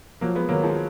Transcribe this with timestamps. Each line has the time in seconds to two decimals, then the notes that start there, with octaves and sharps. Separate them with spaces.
0.21 F3 F#3 A#3
0.35 G#3 B3
0.49 D#3 F#3 A#3
0.63 F3 G#3